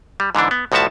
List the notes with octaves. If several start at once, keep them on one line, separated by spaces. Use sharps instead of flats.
G3
G#2 D3 E3 D4
B3
C2 A2 F3 F#4 E5 A5